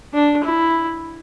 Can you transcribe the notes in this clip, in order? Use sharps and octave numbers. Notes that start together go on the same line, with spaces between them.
D4
E4